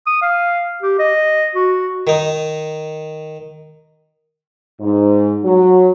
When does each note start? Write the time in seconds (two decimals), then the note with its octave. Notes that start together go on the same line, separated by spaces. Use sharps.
0.07 D#6
0.22 F5
0.82 G4
0.99 D#5
1.55 F#4
2.07 D#3 D#4
4.80 G#2
5.43 F#3